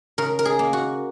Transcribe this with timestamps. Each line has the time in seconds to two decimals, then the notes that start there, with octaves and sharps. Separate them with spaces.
0.18 C#3 A#4
0.39 A#4
0.45 G#4
0.59 A#3
0.73 F#4